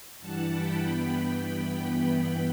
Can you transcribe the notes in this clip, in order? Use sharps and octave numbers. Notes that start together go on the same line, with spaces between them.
G2 E3 G3 F#5 A5
G5 B5
G2 E3 B3